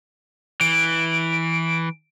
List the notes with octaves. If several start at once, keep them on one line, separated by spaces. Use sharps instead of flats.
E3 D7